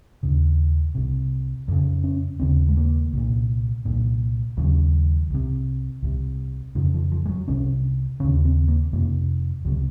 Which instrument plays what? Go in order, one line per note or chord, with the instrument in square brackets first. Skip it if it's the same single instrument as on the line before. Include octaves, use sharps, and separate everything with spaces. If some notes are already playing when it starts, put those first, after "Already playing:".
[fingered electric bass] D#2 C#3
C2 C3
F2 C#3
C#4
D#2 C#3 C4
G#3
A#3
C2 A#2
C2 A#2
D#2 C#3 F#3
C2 C3
C2 C3
F2 C#3 F3
F3
F3
G#3
F#3
C2 C3 C#4
C#3 C#4
D#2
C4
A#3
F2 C3 A#3
C#2 C3 F#3